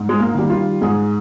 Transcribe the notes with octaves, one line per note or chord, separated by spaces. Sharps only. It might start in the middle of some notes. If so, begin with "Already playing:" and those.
Already playing: G#2
G#3
A#3
D#3 G3
F4
G#2 G#4